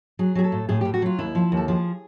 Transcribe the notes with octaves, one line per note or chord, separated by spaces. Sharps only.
F#3 G#4
F#3 G#4
A4
A2
A2 G#4
A2 G4
F#4
F#3 F4
D#2 E4
F3
D#2
A4
F3 G#4